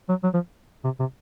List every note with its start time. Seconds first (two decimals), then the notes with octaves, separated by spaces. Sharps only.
0.09 F#3
0.24 F#3
0.34 F3
0.84 C3
1.00 C3